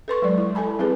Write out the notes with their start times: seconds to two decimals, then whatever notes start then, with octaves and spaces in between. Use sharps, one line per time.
0.08 A4 B4 C6 C#6
0.22 F#3 G#3 D5
0.38 E4
0.55 A4 G#5 A5 B5
0.79 G3 C4 E4 G#4 B4